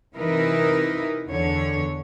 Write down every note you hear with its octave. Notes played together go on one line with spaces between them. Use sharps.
C3 E3 D#4 E4 A#4 B4
E2 D3 C#5